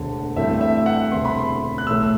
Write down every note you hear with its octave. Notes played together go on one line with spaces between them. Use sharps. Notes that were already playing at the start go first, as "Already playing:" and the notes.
Already playing: E1 D2 D3
G2 E3 A3 C4 E4 E5
E5
E5
F#5
E1 D2 C3 E3 C6
B5
C6
F#6
B1 A2 E3 A3 E6